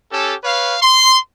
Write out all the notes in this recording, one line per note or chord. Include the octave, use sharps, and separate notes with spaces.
C#4 G4 A4
B4 C#5 F5
C6